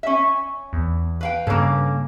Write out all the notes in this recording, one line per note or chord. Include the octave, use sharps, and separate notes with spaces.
C#4 E5
E2
B4 F5 G5
G2 C#3 A#3 C#4 A4